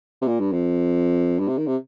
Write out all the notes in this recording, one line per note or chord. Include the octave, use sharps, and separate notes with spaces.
C3
A#2
G2
F2
G2
C3
D#3
C3